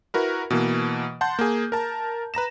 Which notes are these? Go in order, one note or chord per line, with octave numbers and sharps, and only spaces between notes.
E4 F#4 A#4 B4
B2 E3 A#3
F#5 A5 C6 G6
A#3 G#4
A#4 A5 A#5
B4 A#5 A#6 E7